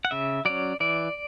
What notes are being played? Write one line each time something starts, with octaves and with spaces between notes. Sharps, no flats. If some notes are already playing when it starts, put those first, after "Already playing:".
F#5
C#3 E5
F#3 C#4 D5
E3 D5